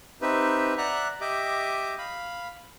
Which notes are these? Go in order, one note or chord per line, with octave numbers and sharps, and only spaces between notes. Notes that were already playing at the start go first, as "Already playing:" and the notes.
C4 D#4 G4 B4 E5
D5 E5 F#5 A#5 F#6
G4 D#5 E5 D6
F5 B5